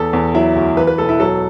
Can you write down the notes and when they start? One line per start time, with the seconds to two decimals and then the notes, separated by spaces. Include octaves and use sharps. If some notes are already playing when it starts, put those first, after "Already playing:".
Already playing: E2 A4
0.13 E2
0.34 F#3 E4
0.56 D2
0.77 E3 B4
0.87 B4
0.98 E1 A4
1.09 E4
1.20 F#3 A4